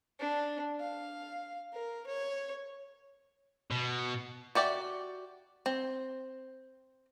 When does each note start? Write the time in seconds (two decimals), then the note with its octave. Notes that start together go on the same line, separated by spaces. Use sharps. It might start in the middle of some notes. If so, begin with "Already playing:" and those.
0.20 D4
0.80 F5
1.73 A#4
2.07 C#5
3.71 B2
4.55 F#4 G4 D5 E5
5.66 C4